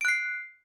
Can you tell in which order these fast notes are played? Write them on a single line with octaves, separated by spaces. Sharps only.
D7 F#6 C7